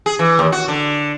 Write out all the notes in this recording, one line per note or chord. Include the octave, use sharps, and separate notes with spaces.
G#4
E3
D#2
F#4
D3